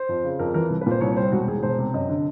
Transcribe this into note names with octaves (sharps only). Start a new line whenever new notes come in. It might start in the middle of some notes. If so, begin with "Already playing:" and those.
Already playing: C5
F2
C#3
F2 A#4
E3 A#4
C2
B4
A#2 C5
C2 C#5
C#5
G3 C5
E1 F#4
E2 G#4
E1 C5
C3
F#2 D#5
D3